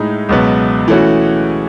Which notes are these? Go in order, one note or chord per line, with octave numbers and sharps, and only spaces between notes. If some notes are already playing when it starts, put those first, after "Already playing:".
Already playing: A2 G#3 D#4
C#2 B2 F#3 B3
E3 A3 C#4 F#4